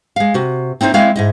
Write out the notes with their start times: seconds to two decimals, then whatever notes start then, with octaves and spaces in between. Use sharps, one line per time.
0.16 G#3 F5
0.34 C3 F#4
0.81 C4 D#4 E4 C5 C#5
0.94 G#3 C4 E4 C#5 E5 F5
1.16 G#2 E4 D#5